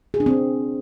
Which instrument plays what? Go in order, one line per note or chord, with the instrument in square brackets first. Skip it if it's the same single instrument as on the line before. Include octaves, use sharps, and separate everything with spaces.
[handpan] G#4
D4
C4